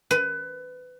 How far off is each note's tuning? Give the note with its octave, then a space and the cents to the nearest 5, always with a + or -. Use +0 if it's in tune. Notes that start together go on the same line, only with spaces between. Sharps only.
B4 +25